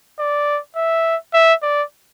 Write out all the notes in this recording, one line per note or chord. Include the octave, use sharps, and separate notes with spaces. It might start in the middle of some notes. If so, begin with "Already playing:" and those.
D5
E5
E5
D5